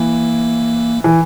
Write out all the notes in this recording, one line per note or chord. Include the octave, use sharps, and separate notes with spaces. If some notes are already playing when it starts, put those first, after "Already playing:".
Already playing: E3 A#3
E3